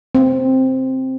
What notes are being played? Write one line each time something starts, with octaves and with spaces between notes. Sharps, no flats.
C4